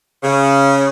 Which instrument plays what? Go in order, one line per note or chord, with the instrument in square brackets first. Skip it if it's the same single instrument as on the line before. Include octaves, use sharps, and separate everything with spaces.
[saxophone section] C#3